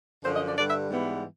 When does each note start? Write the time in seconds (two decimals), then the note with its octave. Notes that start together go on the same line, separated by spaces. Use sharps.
0.24 F#2 D3 F3 C5
0.35 D#5
0.46 D5
0.57 G2 D3 G3 D5
0.69 E5
0.90 G#2 E3 G3 B3